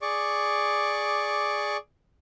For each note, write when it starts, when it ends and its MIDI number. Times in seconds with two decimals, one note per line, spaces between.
0.02 1.77 68
0.02 1.77 74
0.02 1.77 85
0.02 1.77 86